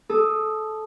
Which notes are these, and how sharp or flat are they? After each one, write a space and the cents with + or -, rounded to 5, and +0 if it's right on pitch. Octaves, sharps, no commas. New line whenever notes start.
A4 -15 D#6 -10